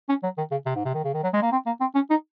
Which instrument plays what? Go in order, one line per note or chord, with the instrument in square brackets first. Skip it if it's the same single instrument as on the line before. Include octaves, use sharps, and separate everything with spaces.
[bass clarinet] C#4
F#3
D#3
C#3
C3
G#2
C3
D#3
C#3
D#3
F#3
G#3
A#3
C4
A#3
C4
C#4
D#4